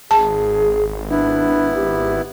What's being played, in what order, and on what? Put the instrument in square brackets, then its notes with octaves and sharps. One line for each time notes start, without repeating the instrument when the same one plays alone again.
[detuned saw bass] G#1 [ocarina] G#4 [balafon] A5
[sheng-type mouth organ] B3 E4 [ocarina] D4
[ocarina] G4